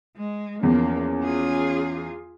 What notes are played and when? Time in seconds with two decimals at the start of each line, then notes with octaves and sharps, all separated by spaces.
0.17 G#3
0.63 E2 F3 A#3 C#4
1.23 F4 G#4